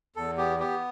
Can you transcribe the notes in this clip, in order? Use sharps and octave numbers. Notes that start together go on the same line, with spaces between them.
E2 A4
B3 G4
B3 G4